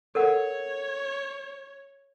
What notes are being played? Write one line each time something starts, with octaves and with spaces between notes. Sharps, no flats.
A4 A#4 C#5 F#5